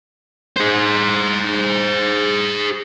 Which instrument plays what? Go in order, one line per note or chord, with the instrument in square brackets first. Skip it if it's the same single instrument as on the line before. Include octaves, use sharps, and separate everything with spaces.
[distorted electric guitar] G#4 C5